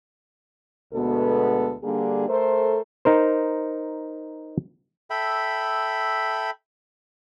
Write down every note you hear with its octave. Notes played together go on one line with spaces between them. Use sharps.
D2 B2 G#3 B3 A4
D3 G3 A#3 D4 G#4
A3 A4 A#4 C5
D#4 A#4 C5
A4 E5 G5 B5